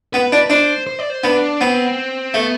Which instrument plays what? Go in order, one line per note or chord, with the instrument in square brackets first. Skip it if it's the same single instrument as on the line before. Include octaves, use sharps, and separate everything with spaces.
[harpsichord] B3 [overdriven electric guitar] B4
[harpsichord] D4
[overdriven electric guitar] B4
[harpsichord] D4 [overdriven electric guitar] C5
[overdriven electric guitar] C5
D5
C5
[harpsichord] B3 [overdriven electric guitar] D4
[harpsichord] B3 [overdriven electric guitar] C4
[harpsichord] A3 [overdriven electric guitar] B3